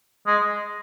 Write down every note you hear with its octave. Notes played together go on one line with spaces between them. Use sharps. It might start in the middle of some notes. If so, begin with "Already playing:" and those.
G#3